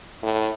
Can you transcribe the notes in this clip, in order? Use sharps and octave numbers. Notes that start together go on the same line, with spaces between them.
A2